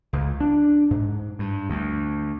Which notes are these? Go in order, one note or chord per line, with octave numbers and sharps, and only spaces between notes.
C#2
D4
G#2
G2
D2